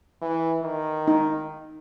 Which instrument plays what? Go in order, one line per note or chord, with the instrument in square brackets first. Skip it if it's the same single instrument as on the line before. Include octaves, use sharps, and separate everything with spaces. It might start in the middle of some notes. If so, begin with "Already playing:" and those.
[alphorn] E3
D#3
[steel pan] D#4